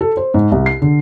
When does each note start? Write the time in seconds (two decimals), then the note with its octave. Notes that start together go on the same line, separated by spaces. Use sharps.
0.01 A4
0.17 C5
0.34 G#2
0.52 C2
0.66 C7
0.82 D3